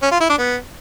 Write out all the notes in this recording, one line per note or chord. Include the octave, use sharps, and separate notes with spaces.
C#4
F4
E4
D4
B3